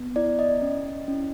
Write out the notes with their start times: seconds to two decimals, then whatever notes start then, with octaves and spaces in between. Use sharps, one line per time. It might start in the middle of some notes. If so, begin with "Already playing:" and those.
Already playing: B3
0.16 E4 D5
0.39 D#5
0.62 C#4
1.08 C#4